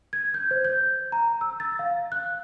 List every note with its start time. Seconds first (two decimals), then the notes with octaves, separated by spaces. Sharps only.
0.13 G#6
0.34 G6
0.51 C5
0.65 G6
1.12 A#5
1.41 E6
1.60 A6
1.79 F5
2.12 F#6